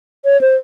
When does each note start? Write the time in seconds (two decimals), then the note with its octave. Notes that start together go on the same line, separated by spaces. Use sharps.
0.25 C#5
0.41 C5